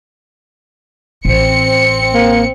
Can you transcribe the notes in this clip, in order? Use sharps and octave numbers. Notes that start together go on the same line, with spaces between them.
A1 C4 C#7
A#3